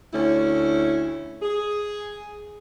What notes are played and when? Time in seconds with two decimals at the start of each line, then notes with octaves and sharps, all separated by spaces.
0.14 D2 C#4 E4
1.42 G#4